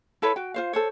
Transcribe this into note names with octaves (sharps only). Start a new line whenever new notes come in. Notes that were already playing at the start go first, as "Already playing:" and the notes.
E4 A4 B4 C#5
F#4 G5
F4 C5 F5
A4 C5 C#5